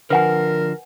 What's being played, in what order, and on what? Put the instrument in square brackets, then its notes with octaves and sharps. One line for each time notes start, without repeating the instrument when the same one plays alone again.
[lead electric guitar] D3 F3 [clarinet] A#4 [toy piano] B4 F#5 G#5